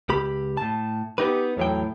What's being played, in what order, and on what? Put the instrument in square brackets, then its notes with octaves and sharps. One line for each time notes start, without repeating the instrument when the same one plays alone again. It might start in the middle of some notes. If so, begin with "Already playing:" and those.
[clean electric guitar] C#2 G4 B5
A2 A5
[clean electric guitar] B3 D#4 B4 [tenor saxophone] G4
[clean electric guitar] E2 F#3 G5 [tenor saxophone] A2